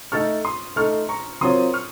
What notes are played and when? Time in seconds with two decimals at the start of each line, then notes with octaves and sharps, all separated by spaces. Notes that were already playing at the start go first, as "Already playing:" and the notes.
0.12 A3 D#4 A4 C#6 F6
0.45 C6 D#6
0.76 A3 D#4 A4 C#6 F6
1.09 A#5 C#6
1.41 F#3 C4 F4 A#4 C#5 C6 D#6
1.73 C#6 F6